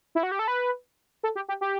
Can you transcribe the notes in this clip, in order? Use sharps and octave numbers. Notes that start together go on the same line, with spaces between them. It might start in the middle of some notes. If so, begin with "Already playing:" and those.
E4
F#4
G4
A4
B4
A4
G4
G4
G4